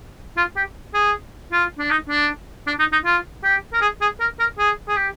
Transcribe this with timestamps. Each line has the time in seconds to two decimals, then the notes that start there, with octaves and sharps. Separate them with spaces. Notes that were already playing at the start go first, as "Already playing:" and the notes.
0.37 F4
0.57 G4
0.94 G#4
1.52 F4
1.79 D4
1.91 D#4
2.10 D4
2.67 D4
2.79 D#4
2.93 D#4
3.05 F4
3.44 G4
3.73 A#4
3.82 G#4
4.01 G#4
4.20 A#4
4.39 A#4
4.59 G#4
4.88 G#4
4.97 G4